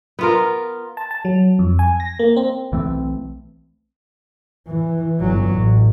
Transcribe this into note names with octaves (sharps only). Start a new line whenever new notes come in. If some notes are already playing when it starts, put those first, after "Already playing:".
B3 F4 A#4
A5
A5
F#3
F2
G#5
A#6
A#3
C4
B1 E3 A3 C4
E3
G1 F#3
A1